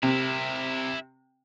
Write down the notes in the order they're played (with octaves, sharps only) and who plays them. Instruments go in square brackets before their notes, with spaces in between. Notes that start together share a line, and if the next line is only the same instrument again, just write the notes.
[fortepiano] C3 [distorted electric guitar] E4 A#4